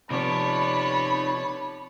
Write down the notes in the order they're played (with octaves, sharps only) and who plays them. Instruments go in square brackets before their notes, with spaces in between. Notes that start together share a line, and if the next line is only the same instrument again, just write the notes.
[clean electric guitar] C3 F3 B3 [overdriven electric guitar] D#4 D5 [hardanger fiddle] C#5 A5 [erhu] B5